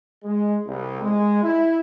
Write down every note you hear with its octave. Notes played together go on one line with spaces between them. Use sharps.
G#3
C2
G#3
E4